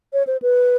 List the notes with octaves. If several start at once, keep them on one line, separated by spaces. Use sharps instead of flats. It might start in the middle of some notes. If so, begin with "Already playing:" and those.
C#5
C5
B4